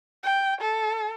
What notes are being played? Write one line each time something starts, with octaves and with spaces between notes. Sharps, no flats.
G5
A4